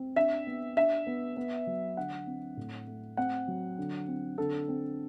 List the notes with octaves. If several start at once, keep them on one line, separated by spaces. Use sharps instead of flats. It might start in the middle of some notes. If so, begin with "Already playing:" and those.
Already playing: C4
D4 E5
B3
D4 E5
B3
B3
F#3
D3 F#5
C4
A2
A3
C4 F#5
F#3
D3
C4
D3 A4
C4